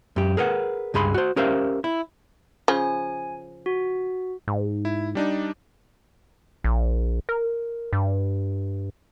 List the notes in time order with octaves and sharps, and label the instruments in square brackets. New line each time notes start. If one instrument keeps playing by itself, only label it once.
[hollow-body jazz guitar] F#2 G4
G#4 A#4 B4 F#5
C#2 G2 G#4 B5 C6
F#4 C5
C#4 G4 A#4 C5 E5 F5
E4
[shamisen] C#3 F3 [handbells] G#5
[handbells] F#4
[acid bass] G#2
[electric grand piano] E4
G3 D4 D#4
[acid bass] A#1
A#4
G2